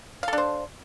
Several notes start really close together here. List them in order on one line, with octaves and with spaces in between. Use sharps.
F5 A4 D4 C5